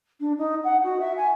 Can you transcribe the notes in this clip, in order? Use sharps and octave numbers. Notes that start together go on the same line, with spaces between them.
D4
D#4
F#5
F#4
E5
G#5